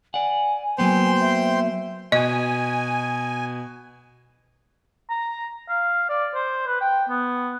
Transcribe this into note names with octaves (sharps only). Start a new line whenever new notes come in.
D5 F#5 G#5
F#3 A#3 B3 C5 G5 C6
E5
B2 D#5 G#5
A#5
F5
D5
C5
B4
G5
B3